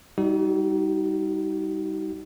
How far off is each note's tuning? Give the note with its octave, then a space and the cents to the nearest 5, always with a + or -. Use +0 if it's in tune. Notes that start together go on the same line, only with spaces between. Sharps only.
G3 +0 D#4 +25 F#4 +45